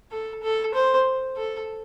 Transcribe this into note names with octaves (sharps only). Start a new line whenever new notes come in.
A4
A4
C5
A4